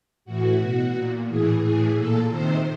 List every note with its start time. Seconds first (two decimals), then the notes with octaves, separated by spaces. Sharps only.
0.25 A2 E3 F#4
0.59 B2
0.93 A#2
1.27 A2 E3 G#4
1.61 A2 E3 G#4
1.95 A#2 A4
2.29 C3 D#3 C5